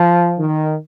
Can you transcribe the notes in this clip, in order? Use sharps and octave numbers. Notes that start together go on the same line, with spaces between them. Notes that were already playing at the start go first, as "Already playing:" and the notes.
Already playing: F3
D#3